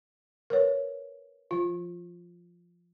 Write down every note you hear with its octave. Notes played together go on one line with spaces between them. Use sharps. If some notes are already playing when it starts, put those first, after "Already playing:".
A#4 B4 C#5
F3 F4